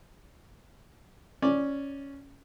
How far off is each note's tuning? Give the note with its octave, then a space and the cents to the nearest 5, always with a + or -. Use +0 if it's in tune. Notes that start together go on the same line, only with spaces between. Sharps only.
C#4 +0 D5 +0